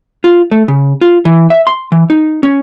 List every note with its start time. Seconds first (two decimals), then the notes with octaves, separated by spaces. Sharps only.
0.24 F4
0.51 A3
0.68 C#3
1.01 F4
1.25 E3
1.50 E5
1.67 C6
1.92 E3
2.10 D#4
2.43 C#4